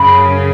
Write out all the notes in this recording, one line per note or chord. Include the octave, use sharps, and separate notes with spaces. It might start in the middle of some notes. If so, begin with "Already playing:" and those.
Already playing: F#2 C#3 F#3 B5